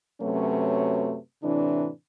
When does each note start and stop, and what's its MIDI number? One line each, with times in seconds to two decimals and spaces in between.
0.21 1.17 42
0.21 1.17 48
0.21 1.17 54
0.21 1.17 57
0.21 1.17 61
0.21 1.17 71
1.43 1.89 45
1.43 1.89 48
1.43 1.89 52
1.43 1.89 62